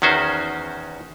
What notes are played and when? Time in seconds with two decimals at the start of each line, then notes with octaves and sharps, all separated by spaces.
0.02 E2 D#3 C#4 F#4 C5